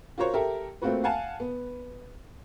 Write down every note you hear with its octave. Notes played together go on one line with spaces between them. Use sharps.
F4 F#4 A#4 C5 C#5
G4 A4 A#4 E5
A3 A#3 C4 F4 F#4 B4
F5 F#5 G#5 A5
B3